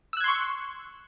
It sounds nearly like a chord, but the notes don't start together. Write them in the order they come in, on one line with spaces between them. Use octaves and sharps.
E6 F#6 G#6 C6 C#6